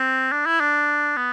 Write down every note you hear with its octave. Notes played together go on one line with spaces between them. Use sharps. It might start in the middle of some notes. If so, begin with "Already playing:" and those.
Already playing: C4
D4
E4
D4
B3